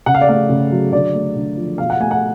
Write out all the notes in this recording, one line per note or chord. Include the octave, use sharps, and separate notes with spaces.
C#3 F#5
F5
D5
A3 F5
C#3
F#3
D3 D5
A3
D3
F3
B2 F5
F#5
A3 G#5
F#5